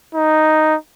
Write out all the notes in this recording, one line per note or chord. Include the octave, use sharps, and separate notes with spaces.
D#4